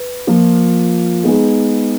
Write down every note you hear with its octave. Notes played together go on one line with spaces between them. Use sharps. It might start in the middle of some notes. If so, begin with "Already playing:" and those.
Already playing: B4
F3 A#3 F4
G#3 B3 D#4 G#4